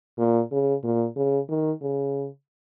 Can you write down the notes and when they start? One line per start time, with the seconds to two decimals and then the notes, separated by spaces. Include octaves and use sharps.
0.18 A#2
0.52 C#3
0.83 A#2
1.17 C#3
1.49 D#3
1.82 C#3